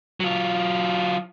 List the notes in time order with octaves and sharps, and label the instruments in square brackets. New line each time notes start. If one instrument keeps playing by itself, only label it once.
[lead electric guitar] F#3 F4